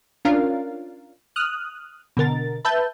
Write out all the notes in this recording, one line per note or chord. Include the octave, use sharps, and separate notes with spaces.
C#4 D4 F4 A#4 F5
D#6 F6 F#6
B2 D3 A#4 A6
B4 E5 A5 G6